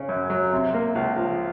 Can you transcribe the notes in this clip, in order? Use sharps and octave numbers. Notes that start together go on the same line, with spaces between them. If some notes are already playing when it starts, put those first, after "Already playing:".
Already playing: C#3 C#4
F#2
F#3
C3
A#3
C#2
F3